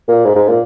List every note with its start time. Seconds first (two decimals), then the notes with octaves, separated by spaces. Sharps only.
0.08 A#2
0.25 G#2
0.36 G#2
0.48 A#2